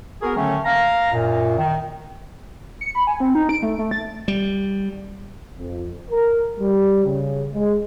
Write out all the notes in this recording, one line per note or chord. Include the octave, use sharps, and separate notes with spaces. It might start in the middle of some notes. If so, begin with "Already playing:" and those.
B3 F#4 G#4 A#4
D3 D#3 F#3 A3 C#4
F5 A#5
F#2 A#2
D#3
C#7
B5
G#5
C4
D#4
D7
A3
A3
A6
G3
F2
A#4
G3
C#3
G#3